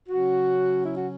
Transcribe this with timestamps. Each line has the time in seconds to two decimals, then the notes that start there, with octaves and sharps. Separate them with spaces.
0.09 C#3 F#3 C#4 F#4
0.83 E4
0.94 F#4